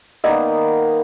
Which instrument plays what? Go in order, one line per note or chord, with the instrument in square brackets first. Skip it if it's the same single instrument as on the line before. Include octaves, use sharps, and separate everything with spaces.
[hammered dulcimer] D#3 A#3 B3 [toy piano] D5 D#5 E6